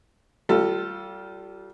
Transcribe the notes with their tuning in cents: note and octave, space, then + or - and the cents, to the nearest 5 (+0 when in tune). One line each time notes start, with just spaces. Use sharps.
G3 -25 F4 +0 A4 +15